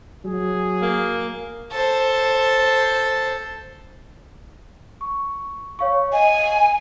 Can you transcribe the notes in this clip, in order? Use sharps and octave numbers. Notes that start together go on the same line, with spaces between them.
F#3 G#4
A#3
A4 C5
C#6
C#5 F5 C#6
D#5 G#5